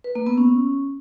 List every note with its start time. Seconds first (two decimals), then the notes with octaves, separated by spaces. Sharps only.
0.04 B4
0.15 A#3
0.26 B3
0.38 C#4